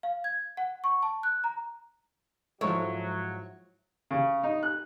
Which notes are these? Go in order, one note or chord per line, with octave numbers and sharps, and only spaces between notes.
F5
G#6
F#5
C#6
A5
F#6
A#5
G#2 F3 F#3 E4 C#5
C#3
D#4
F#6